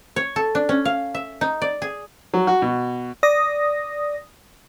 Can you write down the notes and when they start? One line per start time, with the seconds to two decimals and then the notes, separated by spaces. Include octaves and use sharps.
0.16 C#5
0.36 A4
0.55 D4
0.69 C#4
0.85 F5
1.14 E5
1.41 D#4
1.62 D5
1.82 G#4
2.34 F#3
2.47 F#4
2.62 B2
3.23 D5 D#6 A#6